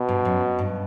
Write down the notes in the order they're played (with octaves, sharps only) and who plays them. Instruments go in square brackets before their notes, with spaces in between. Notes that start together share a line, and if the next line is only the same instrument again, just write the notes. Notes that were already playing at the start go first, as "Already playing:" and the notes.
Already playing: [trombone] B2
[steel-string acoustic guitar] G2
F#2
G2